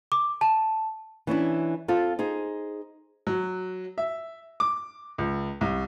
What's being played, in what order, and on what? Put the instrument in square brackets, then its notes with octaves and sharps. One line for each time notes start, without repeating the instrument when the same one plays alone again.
[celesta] D6
A5
[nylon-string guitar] E3 C#4 D4 E4
C4 F4 A4
D#4 G#4 C5
[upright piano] F#3
E5
D6
C#2
C2